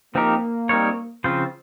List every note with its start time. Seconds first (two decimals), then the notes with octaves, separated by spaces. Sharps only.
0.15 F3 A#3 C4 D#4 G4 A#4
0.69 G3 C4 D#4 A#4 C#5
1.24 C#3 F3 C4 F4 C5